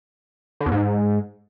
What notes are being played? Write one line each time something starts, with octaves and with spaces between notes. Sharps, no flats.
D3
E2
G#2